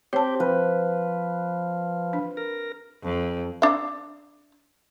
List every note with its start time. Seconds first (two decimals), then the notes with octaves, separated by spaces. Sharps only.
0.13 C4 G4 C#5 A5
0.40 F3 B4
2.13 D4
2.37 A#4
3.04 F2
3.62 D4 E5